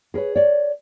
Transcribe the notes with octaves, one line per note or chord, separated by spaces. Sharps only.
G#4 A#4 B4 C#5
C#5 D5